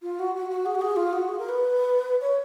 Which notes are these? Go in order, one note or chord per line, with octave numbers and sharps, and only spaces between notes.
F4
F#4
F#4
F#4
G#4
F#4
G#4
F4
F#4
G#4
A#4
B4
C#5